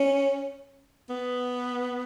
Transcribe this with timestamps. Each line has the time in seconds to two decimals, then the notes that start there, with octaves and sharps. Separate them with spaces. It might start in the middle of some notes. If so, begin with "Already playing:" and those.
Already playing: C#4
1.09 B3